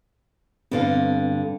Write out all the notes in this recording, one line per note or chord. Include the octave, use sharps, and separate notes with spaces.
G2 D3 B3 C4 F5